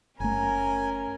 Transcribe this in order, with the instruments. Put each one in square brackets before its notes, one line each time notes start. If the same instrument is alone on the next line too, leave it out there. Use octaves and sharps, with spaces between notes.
[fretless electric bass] F#1 A3 [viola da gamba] C#4 A#4 [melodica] G#5 [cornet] A#5